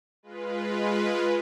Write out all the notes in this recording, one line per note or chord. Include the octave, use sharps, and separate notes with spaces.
G#3 F4 B4